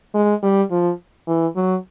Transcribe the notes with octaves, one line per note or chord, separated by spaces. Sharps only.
G#3
G3
F3
E3
F#3